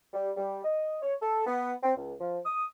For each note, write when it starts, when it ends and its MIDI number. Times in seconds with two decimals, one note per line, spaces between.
0.14 0.32 55
0.37 0.61 55
0.65 0.98 75
1.02 1.15 73
1.22 1.46 69
1.47 1.74 59
1.83 1.94 60
1.95 2.14 37
2.21 2.39 53
2.45 2.67 87